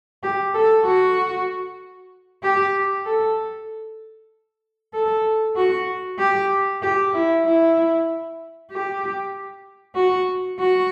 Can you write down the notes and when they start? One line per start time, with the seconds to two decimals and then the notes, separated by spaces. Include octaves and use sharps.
0.23 G4
0.54 A4
0.85 F#4
2.43 G4
3.06 A4
4.93 A4
5.56 F#4
6.19 G4
6.82 G4
7.13 E4
7.44 E4
8.71 G4
9.95 F#4
10.59 F#4